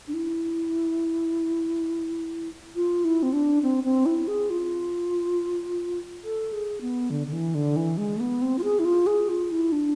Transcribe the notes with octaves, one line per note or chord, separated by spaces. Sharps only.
D4
E4
F4
E4
C4
D4
C4
C4
E4
G#4
F4
A4
G#4
B3
D3
D3
E3
D3
E3
G#3
A3
B3
C4
F4
G#4
E4
F4
G#4
F4
E4
D4